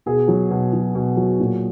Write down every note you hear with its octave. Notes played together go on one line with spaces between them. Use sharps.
B2 G#4
F#3
B2
F#3
B2
F#3
A#2